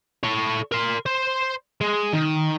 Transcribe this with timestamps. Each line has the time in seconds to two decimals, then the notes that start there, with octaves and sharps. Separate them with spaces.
0.24 A4 C#5
0.72 A#4 C6
1.06 C5
1.81 G#3
2.13 D#3